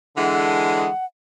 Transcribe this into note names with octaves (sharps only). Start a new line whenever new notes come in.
D3 E3 G#3 F#5